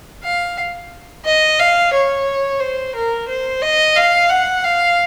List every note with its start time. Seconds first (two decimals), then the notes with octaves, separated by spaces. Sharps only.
0.23 F5
1.25 D#5
1.59 F5
1.93 C#5
2.60 C5
2.95 A#4
3.28 C5
3.62 D#5
3.96 F5
4.30 F#5
4.64 F5